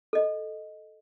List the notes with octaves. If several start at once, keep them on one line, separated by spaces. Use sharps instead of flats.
A4 D#5